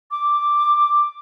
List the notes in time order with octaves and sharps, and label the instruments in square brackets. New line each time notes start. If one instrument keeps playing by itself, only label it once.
[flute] D6